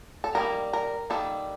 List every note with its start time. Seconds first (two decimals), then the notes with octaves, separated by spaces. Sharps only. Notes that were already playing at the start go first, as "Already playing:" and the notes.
0.24 A4
0.35 D#3 G3 A#3 A#4
0.73 A#4
1.10 D#3 G3 A#3 A4